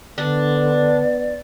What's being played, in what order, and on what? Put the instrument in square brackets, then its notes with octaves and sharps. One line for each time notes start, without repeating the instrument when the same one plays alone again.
[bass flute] D3 [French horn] B3 [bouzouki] D4
[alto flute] D5